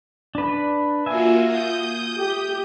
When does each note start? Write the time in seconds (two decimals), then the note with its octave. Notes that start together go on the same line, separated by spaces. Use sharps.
0.35 D4 B4
1.06 A#3 F4 F#4 E5 G#5
1.47 D#6 G6
2.17 G4